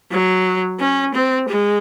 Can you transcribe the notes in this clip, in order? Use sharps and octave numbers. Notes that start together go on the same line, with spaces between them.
F#3
C#4
C4
G#3